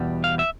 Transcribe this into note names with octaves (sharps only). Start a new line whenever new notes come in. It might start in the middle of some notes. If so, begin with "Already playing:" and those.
Already playing: E2 B2 G3
F5
E5